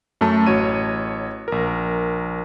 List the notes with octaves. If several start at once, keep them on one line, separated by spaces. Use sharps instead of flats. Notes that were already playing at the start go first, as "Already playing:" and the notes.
F#2 A3 A5
A1 F#4 C#5 D#7
A#1 A#4